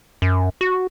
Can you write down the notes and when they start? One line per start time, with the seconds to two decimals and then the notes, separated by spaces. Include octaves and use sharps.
0.22 F#2
0.61 F#4